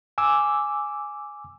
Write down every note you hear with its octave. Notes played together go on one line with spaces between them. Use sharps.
G#5 D6 E6